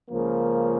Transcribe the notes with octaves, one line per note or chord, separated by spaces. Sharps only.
C#2 C#3 F3 A#3